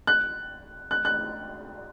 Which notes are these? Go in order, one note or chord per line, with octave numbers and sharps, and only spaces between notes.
F#6
F#6
F#6